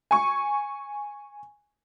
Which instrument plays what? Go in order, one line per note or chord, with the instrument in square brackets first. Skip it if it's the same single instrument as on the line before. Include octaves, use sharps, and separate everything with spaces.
[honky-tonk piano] G#5 C#6